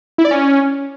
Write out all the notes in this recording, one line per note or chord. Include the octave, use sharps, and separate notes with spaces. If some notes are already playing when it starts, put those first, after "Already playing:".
E4
D5
C#4